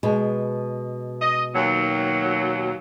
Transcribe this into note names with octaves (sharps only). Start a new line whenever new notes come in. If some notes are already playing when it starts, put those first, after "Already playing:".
B2 G#3
D#5
D#2 F#3